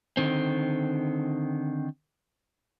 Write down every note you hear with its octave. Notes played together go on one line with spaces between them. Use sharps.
D3 D#3 C4